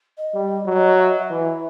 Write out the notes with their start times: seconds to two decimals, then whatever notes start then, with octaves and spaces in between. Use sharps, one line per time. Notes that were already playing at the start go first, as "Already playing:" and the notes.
0.18 D#5
0.34 G3
0.66 F#3
0.98 E5
1.09 D#5
1.19 E5
1.30 E3